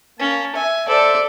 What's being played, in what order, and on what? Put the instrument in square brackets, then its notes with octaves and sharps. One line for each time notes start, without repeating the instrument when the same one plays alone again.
[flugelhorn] A#3 [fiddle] C#4 [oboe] A5
[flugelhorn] E5 [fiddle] G#5
[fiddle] A4 [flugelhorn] C5 [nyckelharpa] D5 [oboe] E5